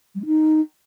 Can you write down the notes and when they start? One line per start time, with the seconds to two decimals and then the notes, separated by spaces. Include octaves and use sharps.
0.15 G3
0.20 G#3
0.26 D#4